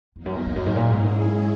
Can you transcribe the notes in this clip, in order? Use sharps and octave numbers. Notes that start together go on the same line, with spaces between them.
E2 F#3 A#3 D#4 A#4
F#2
E2
E2
F#2
G#2
A#2 G#3 C#4 E4 G#4
G#2